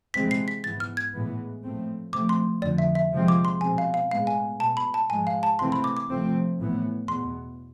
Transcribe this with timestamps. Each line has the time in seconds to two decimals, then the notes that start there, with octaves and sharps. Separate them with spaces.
0.14 C3 E3 G#3 C4 B6
0.31 C7
0.48 B6
0.64 G#2 E3 B3 A6
0.80 F6
0.97 G#6
1.13 A2 E3 G#3 B3
1.63 A2 F3 A3 C4
2.13 C3 F3 A3 C4 D6
2.29 C6
2.62 F2 D3 F3 D5
2.78 E5
2.95 E5
3.12 C3 F3 G#3 C4
3.28 D6
3.45 C6
3.61 B2 G#3 C4 G#5
3.78 F5
3.94 F5
4.11 A2 G#3 B3 F5
4.27 G#5
4.60 B2 B3 A5
4.77 B5
4.94 A5
5.10 G#2 F3 G#3 G#5
5.27 F5
5.43 A5
5.59 C3 E3 A3 C4 C6
5.72 B5
5.84 D6
5.97 D6
6.09 C3 F3 A3 C4
6.59 A2 E3 B3
7.08 E2 B2 B3 C6